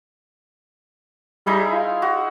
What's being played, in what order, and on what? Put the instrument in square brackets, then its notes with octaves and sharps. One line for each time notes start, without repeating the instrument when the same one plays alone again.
[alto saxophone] G3 [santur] D#4 E4 G#4
[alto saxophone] F4
[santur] F#4